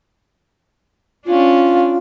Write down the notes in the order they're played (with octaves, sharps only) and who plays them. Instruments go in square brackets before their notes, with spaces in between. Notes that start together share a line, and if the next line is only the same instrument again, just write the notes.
[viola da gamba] C#4 D4 [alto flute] F4